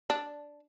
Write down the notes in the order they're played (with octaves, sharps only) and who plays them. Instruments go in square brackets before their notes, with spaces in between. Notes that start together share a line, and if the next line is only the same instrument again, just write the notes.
[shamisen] D4